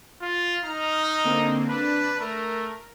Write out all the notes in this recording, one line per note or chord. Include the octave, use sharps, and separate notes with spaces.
F4
D#4 A#5 F6
D3 A#3 C4
D4 B4
A3 A#4